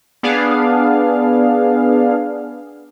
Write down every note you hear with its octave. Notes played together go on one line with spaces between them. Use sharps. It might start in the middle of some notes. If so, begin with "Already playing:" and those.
B3 D4 G#4 F5